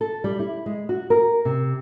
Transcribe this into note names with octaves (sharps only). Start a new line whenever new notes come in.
A4
G3
E4
G#3
F#4
A#4
C3